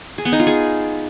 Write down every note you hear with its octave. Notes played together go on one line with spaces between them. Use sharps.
G#4
B3
D#4
F4
G#4